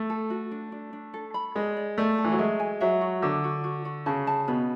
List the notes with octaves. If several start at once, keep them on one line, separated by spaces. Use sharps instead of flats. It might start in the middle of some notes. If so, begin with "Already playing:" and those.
Already playing: A3
A4
F#4
D4
D4
D4
A4
B5
G#3 D5
D5
A3 D5
A4
E3
F#3
G#3 E5
G#5
F#3 E5
F#4
D3 F#4
F#4
F#4
F#4
C#3 A5
A5
B2 B4